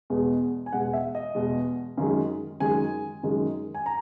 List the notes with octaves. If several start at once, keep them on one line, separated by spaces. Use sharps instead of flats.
E2 B2 G#3
G#5
E2 B2 G#3 F#5
E5
D#5
E2 B2 G#3
F#2 D#3 G#3
F#2 D#3 G#3 G#5
F#2 D#3 G#3
G#5
A#5